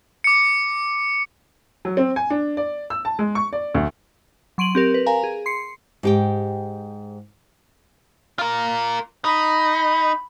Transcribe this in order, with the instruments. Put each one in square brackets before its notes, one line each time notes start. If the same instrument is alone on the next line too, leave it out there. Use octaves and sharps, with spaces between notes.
[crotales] D6 C#7
[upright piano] F#3
C4
G#5
D4
D5
E6
A5
G#3
C#6
D5
D2
[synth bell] F#3 C6 D7 D#7 F#7
C4 G4 A#4
B4
A#4 F5 G#5 A#5
G#4
C6 C7 C#7
[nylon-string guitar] G#2 G4 G5
[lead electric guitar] F4 A#4
[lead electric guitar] D#4 [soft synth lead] B5